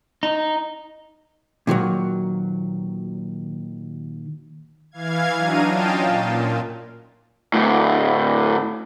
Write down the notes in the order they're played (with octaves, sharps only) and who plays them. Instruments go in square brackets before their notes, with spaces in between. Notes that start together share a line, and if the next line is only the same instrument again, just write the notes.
[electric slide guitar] D#4
[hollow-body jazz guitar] A#2 D#3 E3 F#3
[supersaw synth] E3 F5 G#6
F#3 D4 D#4 A#5 D#7
C#4 F4 D#5 F5 G5 A5
A#2
[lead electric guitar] D2 A2